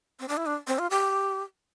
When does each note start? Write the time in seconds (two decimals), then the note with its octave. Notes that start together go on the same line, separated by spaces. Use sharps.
0.20 C4
0.28 D4
0.37 E4
0.46 D4
0.67 C4
0.79 F4
0.91 G4